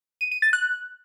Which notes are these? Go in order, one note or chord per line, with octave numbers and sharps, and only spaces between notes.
D#7
D#7
A6
F#6